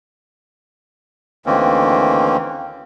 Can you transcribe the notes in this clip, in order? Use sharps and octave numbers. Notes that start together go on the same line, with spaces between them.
D2 D#3 E3 A#3 C4 C#4